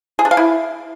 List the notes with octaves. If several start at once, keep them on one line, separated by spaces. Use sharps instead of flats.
G#4
D4
F5
E4